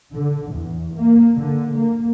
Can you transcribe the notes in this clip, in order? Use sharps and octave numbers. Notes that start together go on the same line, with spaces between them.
D3
E2
A#3
D3
A#3